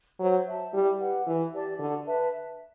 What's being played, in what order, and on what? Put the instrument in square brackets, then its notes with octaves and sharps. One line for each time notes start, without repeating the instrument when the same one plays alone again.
[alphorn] F#3 [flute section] C5
[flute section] E5 A5
[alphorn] G3 [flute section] E4
[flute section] G4 B4 F#5
[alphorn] E3 [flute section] E4
[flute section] G4 D5 A5
[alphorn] D3 [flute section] F#4
[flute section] B4 E5 A5